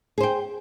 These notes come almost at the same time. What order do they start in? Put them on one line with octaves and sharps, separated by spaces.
G#4 C5 G5